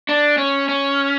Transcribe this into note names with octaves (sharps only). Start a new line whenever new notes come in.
D4
C#4
C#4